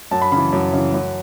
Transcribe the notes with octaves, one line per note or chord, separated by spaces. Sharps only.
F#2 A5
B5
C#3 E3 B5
F#2
C#3 E3
F#2